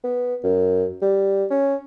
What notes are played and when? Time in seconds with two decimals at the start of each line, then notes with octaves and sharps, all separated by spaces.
0.04 B3
0.44 F#2
1.02 G3
1.50 C#4